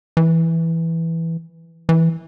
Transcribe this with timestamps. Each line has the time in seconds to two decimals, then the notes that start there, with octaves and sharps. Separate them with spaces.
0.17 E3
1.89 E3